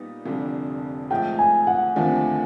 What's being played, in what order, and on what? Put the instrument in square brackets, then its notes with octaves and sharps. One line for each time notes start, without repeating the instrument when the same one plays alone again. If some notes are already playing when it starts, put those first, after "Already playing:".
Already playing: [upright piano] A#2 G3 B3 D#4
F1 F2 D3 G3
[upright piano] G#2 F3 A3 [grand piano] G5
[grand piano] G#5
F#5
[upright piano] D#2 D3 F3 A3 C4